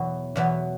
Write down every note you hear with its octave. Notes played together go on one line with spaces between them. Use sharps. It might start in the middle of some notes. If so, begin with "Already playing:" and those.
Already playing: E2 B2 F#3 B3
E2 B2 F#3 B3